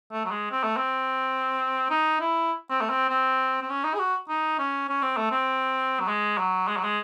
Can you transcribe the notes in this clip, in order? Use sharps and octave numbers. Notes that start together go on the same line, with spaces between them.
A3
F#3
G#3
C4
A3
C4
D#4
E4
C4
A3
C4
C4
C4
C#4
D#4
G#4
F#4
D#4
C#4
C#4
C4
A3
C4
F#3
G#3
F#3
G#3
F#3
G#3